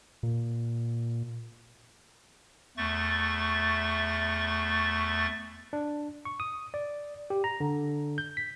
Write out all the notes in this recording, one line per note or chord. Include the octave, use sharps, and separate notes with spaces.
A#2
E2 A3 C#6 A6
D4
C#6
D#6
D5
G4
A#5
D3
G6
B6